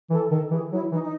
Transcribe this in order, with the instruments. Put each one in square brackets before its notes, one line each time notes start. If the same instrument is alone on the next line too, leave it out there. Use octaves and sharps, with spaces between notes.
[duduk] E3 [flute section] A4
[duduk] D#3 [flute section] A4
[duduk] E3 [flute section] G#4
[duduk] F#3 [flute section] E4
[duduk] E3 [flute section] D#4
[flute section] D#4